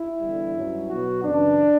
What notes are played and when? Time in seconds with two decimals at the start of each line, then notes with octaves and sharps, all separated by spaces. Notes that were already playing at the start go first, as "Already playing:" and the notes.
Already playing: E4
0.21 E2 D3 G3
0.55 G2 F#3 C#4
0.89 B2 F#3 B3 F#4
1.24 F#2 C#3 E3 D4